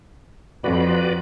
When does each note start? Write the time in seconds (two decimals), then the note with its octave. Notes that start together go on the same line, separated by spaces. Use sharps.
0.64 F2 F#4 B4 D5